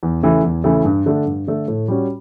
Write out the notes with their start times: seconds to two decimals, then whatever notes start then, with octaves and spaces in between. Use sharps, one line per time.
0.03 E2
0.23 C#3 E3 A3
0.44 E2
0.64 C#3 E3 A3
0.85 G2
1.06 D3 A3 D4 A4
1.26 G2
1.47 D3 A3 D4 A4
1.68 A2
1.88 G3 C#4 F#4 C#5